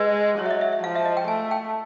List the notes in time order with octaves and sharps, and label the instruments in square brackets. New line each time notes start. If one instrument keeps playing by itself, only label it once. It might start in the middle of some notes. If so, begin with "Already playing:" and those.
Already playing: [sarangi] G#3 [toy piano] B4
[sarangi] F#3 [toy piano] C#5
[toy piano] E5
D#5
E5
E5
[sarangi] F3 [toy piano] F5
[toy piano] E5
D#5
G5
[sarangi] A3 [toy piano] G#5
[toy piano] G5